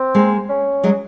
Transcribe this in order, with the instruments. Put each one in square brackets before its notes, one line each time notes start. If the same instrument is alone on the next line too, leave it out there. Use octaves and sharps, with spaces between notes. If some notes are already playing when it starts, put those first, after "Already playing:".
Already playing: [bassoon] C4
[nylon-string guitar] G#3 A#3
[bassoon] C#4
[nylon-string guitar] F#3 G#3